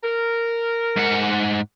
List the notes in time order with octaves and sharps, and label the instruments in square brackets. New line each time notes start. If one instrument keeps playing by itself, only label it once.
[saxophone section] A#4
[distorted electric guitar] G#2 F#5